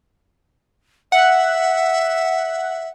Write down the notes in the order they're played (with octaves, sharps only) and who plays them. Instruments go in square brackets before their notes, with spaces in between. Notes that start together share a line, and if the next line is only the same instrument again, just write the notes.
[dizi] E5 [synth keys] F#5